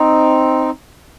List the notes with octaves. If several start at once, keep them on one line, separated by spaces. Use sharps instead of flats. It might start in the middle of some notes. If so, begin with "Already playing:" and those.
Already playing: C4 D#4